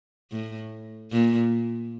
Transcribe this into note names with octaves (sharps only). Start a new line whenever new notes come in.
A2
A#2